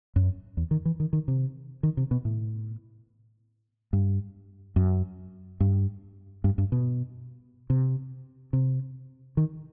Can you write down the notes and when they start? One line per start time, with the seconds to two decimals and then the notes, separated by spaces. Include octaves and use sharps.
0.16 F#2
0.57 E2
0.71 D#3
0.85 E3
1.00 D#3
1.13 D#3
1.28 C3
1.83 D#3
1.97 C3
2.11 B2
2.25 A2
3.93 G2
4.76 F#2
5.60 G2
6.44 G2
6.58 G2
6.72 B2
7.70 C3
8.53 C3
9.37 D#3